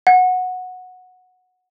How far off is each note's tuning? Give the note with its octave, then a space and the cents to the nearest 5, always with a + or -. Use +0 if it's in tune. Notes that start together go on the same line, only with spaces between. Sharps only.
F#5 -10